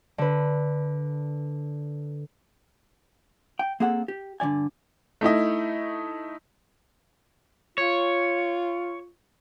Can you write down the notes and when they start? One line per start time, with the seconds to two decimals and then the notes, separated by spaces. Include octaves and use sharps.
0.18 D3 B4
3.59 G5
3.80 A#3 C4 G#4 A4 F#5
4.08 G4
4.40 G2 D3 D#3 D5 G#5
5.21 A3 D#4 E4 D#5
7.78 F4 C#5